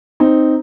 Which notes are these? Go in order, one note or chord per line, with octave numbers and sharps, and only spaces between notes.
C4 D#4